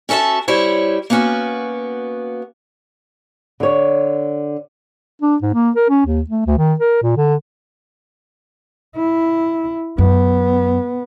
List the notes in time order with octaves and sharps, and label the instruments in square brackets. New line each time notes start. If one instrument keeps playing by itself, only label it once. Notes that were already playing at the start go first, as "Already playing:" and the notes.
[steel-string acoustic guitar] C#4 F#4 A4 E5 A5
G3 E4 C5 C#5
A#3 B3 C#4 F#4
[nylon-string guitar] D3 C#5
[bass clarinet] D4
G#2
A#3
A#4
C#4
D#2
A3
D2
D#3
A#4
A#2
D3
[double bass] E4
[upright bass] F#2 [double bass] B3